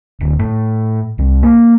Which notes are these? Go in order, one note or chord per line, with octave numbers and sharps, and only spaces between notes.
D1
A2
C2
A#3